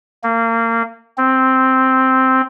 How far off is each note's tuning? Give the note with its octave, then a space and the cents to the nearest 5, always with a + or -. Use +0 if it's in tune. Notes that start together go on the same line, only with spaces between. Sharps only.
A#3 -30
C4 +0